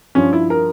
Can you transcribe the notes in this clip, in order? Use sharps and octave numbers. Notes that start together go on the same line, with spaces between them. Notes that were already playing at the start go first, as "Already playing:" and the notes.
G2 F3 C#4
E4
A#4